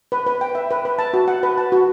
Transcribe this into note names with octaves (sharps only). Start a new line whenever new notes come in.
B4
B4
G5
E5
B4
B4
A5
F#4
F#5
B4
A5
F#4